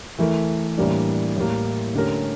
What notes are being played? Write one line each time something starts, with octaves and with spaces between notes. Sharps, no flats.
E3 A3 E4 A#4
A2 E3 G3 A#3 D4
A2 G3 A#3
D3 A3 C#4 G4 A#4